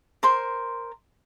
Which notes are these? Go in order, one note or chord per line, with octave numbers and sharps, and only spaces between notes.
A#4 C5 C6